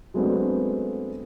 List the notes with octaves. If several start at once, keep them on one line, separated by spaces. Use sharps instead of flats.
F#3 G#3 A3 B3 C4 D4